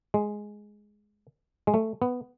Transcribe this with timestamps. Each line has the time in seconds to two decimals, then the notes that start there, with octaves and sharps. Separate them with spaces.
0.14 G#3
1.67 G#3
1.74 A3
2.02 B3